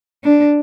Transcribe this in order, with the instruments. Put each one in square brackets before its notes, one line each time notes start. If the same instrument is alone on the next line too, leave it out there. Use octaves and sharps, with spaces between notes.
[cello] D4